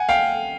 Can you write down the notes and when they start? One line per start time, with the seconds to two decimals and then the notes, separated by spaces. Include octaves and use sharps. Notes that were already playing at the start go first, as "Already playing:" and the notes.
Already playing: F#5 G#5
0.09 F5 G5